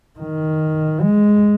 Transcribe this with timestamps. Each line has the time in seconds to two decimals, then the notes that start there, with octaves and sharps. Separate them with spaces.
0.19 D#3
1.01 G#3